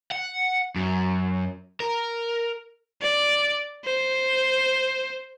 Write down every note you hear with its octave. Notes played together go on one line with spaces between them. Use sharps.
F#5
F#2
A#4
D5
C5